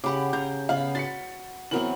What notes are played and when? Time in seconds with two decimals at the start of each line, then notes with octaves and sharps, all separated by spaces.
0.04 C#3 G4 F#5 B5 D6
0.33 C#3 A#5 G6
0.69 C#3 B3 F5 B5
0.95 F#4 C6 A6 B6 C#7
1.71 E3 F#3 B3 C4 A#4 F#7